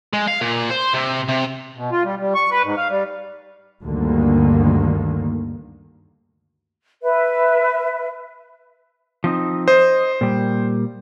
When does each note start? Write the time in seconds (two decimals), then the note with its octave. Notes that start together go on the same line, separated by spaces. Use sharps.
0.13 G#3
0.28 F5
0.41 A#2
0.70 C5
0.94 C3
1.28 C3
1.76 B2
1.92 F4
2.04 G3
2.19 G3
2.35 C#6
2.51 B4
2.64 G#2
2.77 F5
2.89 G3
3.82 D2 G2 D3 D#3 A#3
7.03 B4 E5
9.24 F3 C4 D#4
9.68 C5 D#5
10.21 A#2 G3